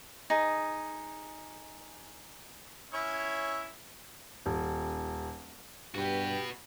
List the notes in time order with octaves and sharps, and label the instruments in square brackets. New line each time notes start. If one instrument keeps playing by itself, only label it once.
[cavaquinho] D#4 G#4
[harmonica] C#4 E4 C#5
[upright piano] D#1
[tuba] G2 [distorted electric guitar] F#4 B4 [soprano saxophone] G4